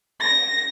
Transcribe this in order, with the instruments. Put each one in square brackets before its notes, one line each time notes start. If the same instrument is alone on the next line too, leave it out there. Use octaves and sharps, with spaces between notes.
[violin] A#6